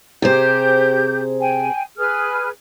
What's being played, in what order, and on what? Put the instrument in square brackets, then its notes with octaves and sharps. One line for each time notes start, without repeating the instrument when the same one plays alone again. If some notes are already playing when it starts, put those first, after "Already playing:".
[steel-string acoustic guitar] C3 G#4 C5 [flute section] G4 G6
[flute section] G5 G#5
G#4 B4 F6